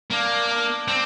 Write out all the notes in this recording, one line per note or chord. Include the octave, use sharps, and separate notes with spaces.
A#3 D4
D4
C4